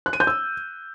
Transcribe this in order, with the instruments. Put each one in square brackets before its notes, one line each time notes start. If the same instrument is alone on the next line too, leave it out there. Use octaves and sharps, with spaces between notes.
[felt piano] F#6
D#7
G6
E6